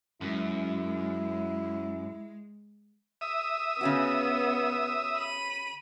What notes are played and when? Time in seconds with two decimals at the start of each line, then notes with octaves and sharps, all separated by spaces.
0.21 F#2 G#3 E4
3.21 E5 D#6
3.81 C#3 B3 C#4 F#4
5.17 B5 D#7